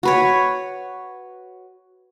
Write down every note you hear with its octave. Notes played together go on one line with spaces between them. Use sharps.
F#4 B4 C#5